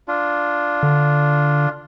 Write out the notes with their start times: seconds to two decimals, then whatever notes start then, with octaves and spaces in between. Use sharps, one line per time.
0.08 D4 F4
0.83 D3